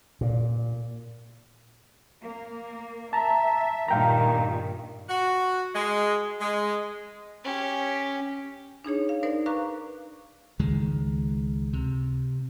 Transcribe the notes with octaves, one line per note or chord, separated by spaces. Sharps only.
A#2
A#3
E5 A5 A#5
G2 A#2 D#3 F5 G5 A#5
F#4
G#3
G#3
C#4 G4
D4 D#4 G#4 C#5
F5
D#4 A#4 C5 D5
B4 F5 A#5 C#6 D6 F#6
C#2 D#3 G#3
C3